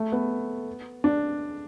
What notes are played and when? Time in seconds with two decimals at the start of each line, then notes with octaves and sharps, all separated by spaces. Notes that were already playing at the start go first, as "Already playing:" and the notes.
Already playing: A3
0.12 B3
1.04 D4